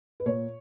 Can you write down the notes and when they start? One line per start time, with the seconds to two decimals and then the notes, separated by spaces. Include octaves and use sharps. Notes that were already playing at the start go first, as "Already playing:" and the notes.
0.20 B4
0.26 A#2 C#5